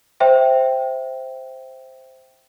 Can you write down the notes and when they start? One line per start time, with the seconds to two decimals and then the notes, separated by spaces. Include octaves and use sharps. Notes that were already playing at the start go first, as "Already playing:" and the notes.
0.20 C5 E5 G5